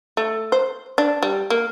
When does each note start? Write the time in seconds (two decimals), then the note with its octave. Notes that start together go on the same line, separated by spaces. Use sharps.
0.17 A3
0.52 C5
0.98 D4
1.23 G3
1.50 A#3